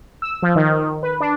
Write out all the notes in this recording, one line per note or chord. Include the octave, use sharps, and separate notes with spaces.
E6
F3
D#3
B4
D4